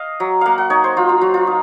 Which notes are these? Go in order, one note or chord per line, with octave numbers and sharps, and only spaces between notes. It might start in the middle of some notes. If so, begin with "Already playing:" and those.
Already playing: D#5 F5
F#3
A#3 F5 F#5
F#5
D#4 C#5
C5
F#3 F4
F4
F#3 F#4
F4
D#4